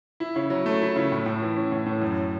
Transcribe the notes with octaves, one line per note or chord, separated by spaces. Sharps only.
E4
C#3
F#3
A3
E4
C#3
A2
A2
E3
C#4
A2
A2
F#2